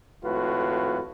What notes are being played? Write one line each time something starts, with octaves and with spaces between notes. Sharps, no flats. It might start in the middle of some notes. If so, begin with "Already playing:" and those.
G#1 F2 A2 F4 F#4 B4